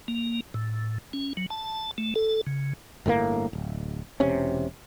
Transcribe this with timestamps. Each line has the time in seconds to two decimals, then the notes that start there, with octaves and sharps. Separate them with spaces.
0.08 A#3
0.54 A2
1.13 C#4
1.37 F#3
1.50 A5
1.98 A3
2.16 A4
2.47 C#3
3.06 G1 A2 D3 A#3
3.53 D1
4.20 E1 C3 C#4